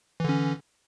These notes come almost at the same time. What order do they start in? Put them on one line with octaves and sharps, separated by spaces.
E3 D3 C#4